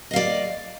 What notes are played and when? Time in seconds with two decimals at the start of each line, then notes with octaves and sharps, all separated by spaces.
0.11 D#5
0.13 F5
0.16 D5